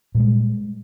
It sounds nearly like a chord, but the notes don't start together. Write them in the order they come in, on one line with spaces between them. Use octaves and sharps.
A#2 G3 G#3